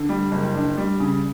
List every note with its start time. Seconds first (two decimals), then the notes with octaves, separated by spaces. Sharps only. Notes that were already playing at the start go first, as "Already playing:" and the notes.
Already playing: D3
0.09 G3
0.32 F#1
0.54 D4
0.78 G3
1.00 C#3